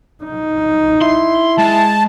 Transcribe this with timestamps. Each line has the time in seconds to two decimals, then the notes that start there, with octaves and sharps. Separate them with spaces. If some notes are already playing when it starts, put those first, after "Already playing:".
0.24 D#4
1.01 E4 C6
1.58 G#3 A5